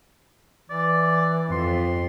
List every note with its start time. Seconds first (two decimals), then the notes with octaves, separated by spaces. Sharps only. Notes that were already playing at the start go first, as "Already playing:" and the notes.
0.70 E3 D5
1.52 F2 C6